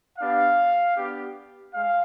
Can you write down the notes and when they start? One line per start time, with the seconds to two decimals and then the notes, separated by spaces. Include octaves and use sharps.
0.18 B3 D4 G4 F5
0.96 B3 D4 G4
1.74 G#3 F5